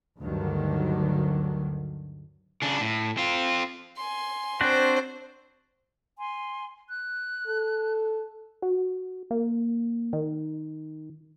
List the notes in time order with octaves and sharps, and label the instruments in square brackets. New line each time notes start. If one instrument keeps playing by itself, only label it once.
[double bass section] D2 G2 D3 D#3 F#3
[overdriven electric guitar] C#3 D4
A2
C4 F4
[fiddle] G#5 C6
[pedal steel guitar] C4 D4 F#4 [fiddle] C5
[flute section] G#5 C6
F#6
[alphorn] A4
[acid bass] F#4
A#3
D#3